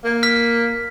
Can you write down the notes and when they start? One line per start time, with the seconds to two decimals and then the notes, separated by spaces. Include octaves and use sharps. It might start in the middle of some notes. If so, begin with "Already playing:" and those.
0.04 A#3
0.23 F6 B6